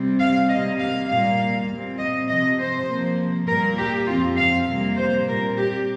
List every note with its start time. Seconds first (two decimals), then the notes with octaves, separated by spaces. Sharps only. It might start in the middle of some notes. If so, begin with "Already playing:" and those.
Already playing: C3 G3 C4
0.19 F5
0.49 C3 G3 A#3 D#5
0.80 F5
1.08 A#2 G3 A#3 F5
1.69 A#2 G3 C4
1.99 D#5
2.28 C3 F3 C4 D#5
2.58 C5
2.89 C3 F3 A#3
3.48 A#2 G3 A#3 A#4
3.78 G4
4.07 F2 F3 C4 F4
4.38 F5
4.68 C3 G3 A#3
4.97 C5
5.27 A#2 G3 C4 A#4
5.57 G4